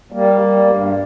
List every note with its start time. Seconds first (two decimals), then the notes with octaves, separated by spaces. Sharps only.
0.12 G3 A#3
0.41 G3
0.68 G2